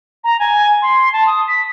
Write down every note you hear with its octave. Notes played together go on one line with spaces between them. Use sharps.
A#5
G#5
C6
A5
D#6
B6